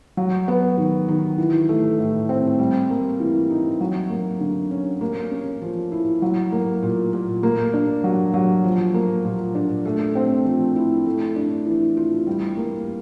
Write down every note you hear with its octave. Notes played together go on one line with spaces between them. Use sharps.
F#3
B3
D#3
D#3
E3
A3
A2
C4
G3
A#3
E3
D#4
F#3
A#3
D3
C#4
A#3
C#4
F3
E4
F#3
A#3
A#2
A#2
A#3
D4
F#3
F#3
F3
A#3
A#2
D4
A3
C4
F3
E4
A3
D4
E3
F4
G3
A#3